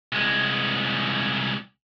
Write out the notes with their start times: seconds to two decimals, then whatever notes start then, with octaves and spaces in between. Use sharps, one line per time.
0.12 C2 G#3